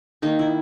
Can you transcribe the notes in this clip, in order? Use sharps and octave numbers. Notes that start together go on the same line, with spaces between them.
D#3 A#3 D#4
E4